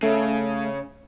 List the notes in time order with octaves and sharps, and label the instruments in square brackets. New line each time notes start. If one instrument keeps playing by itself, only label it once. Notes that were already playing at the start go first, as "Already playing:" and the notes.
[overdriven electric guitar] C#3 [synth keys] A3